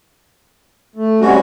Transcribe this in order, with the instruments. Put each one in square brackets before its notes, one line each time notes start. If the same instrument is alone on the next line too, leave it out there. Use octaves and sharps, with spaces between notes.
[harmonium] A3
[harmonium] C3 G#3 C#4 [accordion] G3 F#4